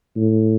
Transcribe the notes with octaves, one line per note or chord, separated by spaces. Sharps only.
A2